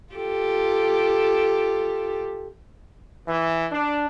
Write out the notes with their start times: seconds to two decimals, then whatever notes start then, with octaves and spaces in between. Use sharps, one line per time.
0.14 F4 G4 A4
3.27 E3
3.72 D4